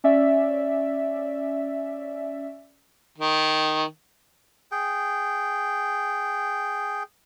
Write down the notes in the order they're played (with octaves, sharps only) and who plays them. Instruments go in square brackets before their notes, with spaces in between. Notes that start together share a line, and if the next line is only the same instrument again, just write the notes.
[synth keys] C#4 D5 E5
[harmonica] D#3
[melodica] G#4 G5